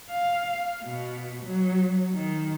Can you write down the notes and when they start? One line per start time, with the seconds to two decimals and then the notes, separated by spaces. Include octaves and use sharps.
0.11 F5
0.84 B2
1.45 F#3
2.14 D#3